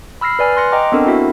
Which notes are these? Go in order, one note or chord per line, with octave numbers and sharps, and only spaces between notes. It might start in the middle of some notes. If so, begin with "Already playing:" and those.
B5 E6 F6 A#6 C7
B4 D5 G#5 F6
C6 F#6 A#6 C#7
D#5 G5 A#5 D6
B3 C4 D4 A4 A#4
E4 F#4 E5